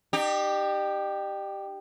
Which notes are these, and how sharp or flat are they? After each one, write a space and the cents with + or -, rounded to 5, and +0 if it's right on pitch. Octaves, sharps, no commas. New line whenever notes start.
D#4 -45 G4 +0